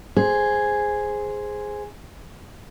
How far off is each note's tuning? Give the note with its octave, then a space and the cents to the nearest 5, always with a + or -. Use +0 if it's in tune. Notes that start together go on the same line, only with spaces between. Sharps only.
G#4 +0 C5 +0